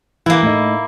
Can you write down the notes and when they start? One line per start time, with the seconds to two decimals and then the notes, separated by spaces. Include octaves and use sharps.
0.26 E3 A#3 E4
0.42 A2 D#4